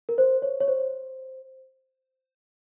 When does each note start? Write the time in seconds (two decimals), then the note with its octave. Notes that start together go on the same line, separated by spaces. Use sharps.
0.09 A#4
0.18 C5
0.42 C#5
0.60 C#5
0.68 C5